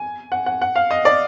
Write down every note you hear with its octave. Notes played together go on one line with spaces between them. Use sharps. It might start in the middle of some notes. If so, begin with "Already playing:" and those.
Already playing: G#5
F#5
F#5
F#5
F5
D#5
D5